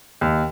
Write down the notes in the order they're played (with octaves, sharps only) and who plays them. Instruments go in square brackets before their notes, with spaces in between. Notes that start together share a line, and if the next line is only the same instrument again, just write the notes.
[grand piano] D#2